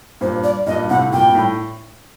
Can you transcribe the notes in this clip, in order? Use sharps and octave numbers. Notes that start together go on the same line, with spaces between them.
G2 A#2 C5
D5
G2 A#2 D#5
A2 C3 F#5
G2 A#2 G5
A2